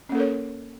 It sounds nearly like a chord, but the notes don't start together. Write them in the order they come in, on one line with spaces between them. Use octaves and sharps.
C#4 A#3 A4 A#4 C#5